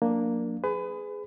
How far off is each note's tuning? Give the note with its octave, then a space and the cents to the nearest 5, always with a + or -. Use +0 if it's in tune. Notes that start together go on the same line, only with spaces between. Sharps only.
F#3 -45 A#3 +0 D4 +0
G#4 +0 B4 +30